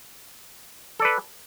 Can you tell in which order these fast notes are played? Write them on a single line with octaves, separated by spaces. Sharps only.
A4 D5 B4